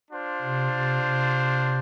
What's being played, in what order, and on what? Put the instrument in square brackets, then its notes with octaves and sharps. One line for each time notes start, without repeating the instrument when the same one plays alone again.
[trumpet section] D4 F4 C5
[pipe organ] C3
C3
C3